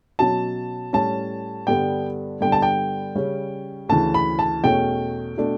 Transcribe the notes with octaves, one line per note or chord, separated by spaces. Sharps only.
B2 F#3 C#4 A5
A2 G3 C#4 A5
G2 D3 G3 B3 D4 G5
G2 D3 G3 B3 G5
A5
G5
C#3 G3 C#4
D2 C#3 E3 A5
B5
A5
E2 B2 A3 C#4 G5
B2 A3 D4